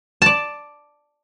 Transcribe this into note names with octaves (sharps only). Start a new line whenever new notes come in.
D5 A5